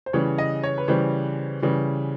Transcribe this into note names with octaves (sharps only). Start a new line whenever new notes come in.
C5
C#3 E3 G3 C#5
D#5
C#5
B4
C#3 E3 G3 C5
C#3 E3 G3